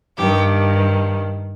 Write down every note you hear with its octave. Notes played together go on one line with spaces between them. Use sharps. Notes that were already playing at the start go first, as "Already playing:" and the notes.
G2 D#3 G4